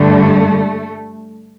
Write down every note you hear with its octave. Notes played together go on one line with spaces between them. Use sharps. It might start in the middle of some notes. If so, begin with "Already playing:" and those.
Already playing: G2 D3 G3 A3